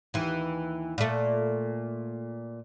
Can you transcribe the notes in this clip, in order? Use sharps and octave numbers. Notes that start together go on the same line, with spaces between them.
D#2 E3
A#2 A3